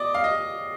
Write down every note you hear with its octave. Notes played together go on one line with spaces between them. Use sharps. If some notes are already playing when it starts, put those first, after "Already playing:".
Already playing: D5 D#5
F5
D#5